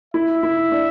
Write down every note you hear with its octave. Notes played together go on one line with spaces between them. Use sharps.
E4 E5
E4
D4